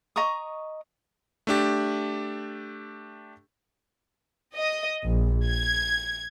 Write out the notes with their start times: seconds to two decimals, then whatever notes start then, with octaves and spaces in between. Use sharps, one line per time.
0.16 D#5 A#5 C#6 D#6
1.47 A3 D4 G4
4.56 D#5
5.03 A#1
5.46 G#6